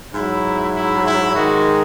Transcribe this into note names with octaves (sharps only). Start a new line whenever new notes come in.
G#2 F#3 E4
E4
E4
G#2 D#3 G#3 F#4